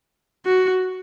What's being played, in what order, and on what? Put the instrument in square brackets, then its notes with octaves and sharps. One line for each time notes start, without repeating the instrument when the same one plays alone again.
[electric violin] F#4